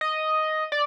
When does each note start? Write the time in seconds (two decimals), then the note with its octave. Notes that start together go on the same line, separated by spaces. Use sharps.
0.01 D#5
0.72 D5